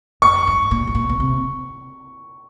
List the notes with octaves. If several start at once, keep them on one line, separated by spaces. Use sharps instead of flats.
F#2 C#6
G2
A#2
A2
A#2
B2
C3